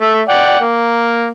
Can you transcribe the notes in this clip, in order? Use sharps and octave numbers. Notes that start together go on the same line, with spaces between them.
A3 E5
D5 F#5 G5
A#3